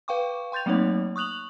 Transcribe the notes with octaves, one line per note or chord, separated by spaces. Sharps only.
B4 F5 G5 C#6 D6
G5 C6 G6 A6 F7
F#3 A3 A#3 C4 D#4 C#5
C#6 D#6 F#6 F7 F#7